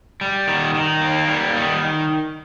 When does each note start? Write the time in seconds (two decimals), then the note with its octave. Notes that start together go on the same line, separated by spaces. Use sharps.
0.21 G3
0.47 D#3
0.74 D#3
1.01 A#3
1.28 G3
1.56 D#3